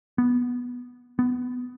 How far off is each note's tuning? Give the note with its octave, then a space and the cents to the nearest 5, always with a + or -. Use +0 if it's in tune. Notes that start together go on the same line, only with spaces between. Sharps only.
B3 -10
B3 +15